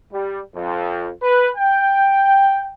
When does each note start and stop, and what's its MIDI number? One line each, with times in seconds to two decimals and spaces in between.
0.12 0.39 55
0.55 1.09 41
1.22 1.48 71
1.57 2.74 79